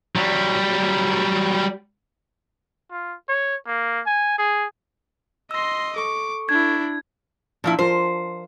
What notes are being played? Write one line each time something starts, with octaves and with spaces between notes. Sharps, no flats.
F#3 G3
F4
C#5
A#3
G#5
G#4
D#5 C6 E6 A#6
A4 C#6 D6
D4 E4 G#6
A#2 F3 D4 E4
F3 F4 A#4 C5